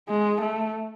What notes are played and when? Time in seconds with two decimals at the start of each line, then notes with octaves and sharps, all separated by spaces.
0.09 G#3
0.41 A3